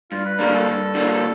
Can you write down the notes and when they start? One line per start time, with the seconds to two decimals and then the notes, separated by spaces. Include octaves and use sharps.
0.11 G2 F4
0.25 B4
0.39 D3 G3 A#3 D4 A#4
0.53 A4
0.67 G2
0.94 D3 G3 A#3 D4